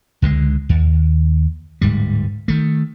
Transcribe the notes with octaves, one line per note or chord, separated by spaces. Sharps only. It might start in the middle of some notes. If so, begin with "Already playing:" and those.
C#2 D3 F3 G#3
D#2
D1 G#2 G3
D#3 A3